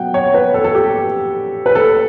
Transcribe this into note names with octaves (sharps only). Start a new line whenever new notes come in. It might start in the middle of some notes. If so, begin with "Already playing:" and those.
Already playing: B2 F#3 F#5 G5
C#5
B4
A4
A4
G4
B4
A4